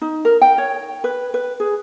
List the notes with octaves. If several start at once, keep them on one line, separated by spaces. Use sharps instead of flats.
D#4
A#4
G5
C#5
B4
B4
G#4